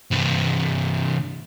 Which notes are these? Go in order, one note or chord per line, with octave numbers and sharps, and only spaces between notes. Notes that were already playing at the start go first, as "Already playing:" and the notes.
C2 G2